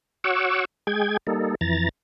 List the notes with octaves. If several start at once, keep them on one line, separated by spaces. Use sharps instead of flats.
F#4 C#5 F#5 C#6 D6 E6
G#3 G#4 G5 G#6
G3 A#3 D#4 A4
F2 E3 A#5 A6